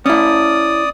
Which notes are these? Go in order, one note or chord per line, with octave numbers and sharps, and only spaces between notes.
C#4 E4 D5 D#6